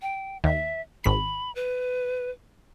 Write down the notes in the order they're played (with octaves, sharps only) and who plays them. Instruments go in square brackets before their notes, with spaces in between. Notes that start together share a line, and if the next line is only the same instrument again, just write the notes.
[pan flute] G5
[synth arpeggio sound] D#2 [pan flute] E5
[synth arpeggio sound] G#1 B6 [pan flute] B5
[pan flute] B4